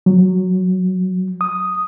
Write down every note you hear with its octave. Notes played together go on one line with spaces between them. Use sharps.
F#3
D#6